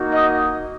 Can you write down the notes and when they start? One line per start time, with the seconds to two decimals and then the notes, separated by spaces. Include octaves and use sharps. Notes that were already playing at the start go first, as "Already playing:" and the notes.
Already playing: A#3 D#4 F#4
0.13 D#5